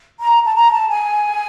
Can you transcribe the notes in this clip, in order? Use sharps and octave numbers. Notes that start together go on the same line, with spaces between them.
A#5
A5
A#5
A5
G#5